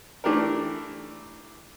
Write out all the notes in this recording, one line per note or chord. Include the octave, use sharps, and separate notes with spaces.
E3 A3 D4 G4 A#4